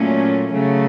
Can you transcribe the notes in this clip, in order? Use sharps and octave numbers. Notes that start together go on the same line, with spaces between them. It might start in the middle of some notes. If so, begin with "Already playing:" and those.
Already playing: A#2 F#3 A3 C#4
C#3 F#3 A3